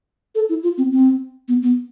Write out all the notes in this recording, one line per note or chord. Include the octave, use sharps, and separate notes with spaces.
A4
E4
F4
C4
C4
B3
B3